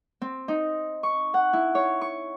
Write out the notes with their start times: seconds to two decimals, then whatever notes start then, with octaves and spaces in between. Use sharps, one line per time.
0.21 C4
0.48 D#4
1.03 C#6
1.34 F#5
1.53 E4
1.75 C#5
2.01 C#6